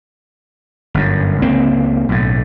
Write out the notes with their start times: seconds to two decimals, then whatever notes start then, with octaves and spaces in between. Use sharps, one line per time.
0.94 G1 F#2
1.42 C#2 A#3 C4
2.09 B1 A2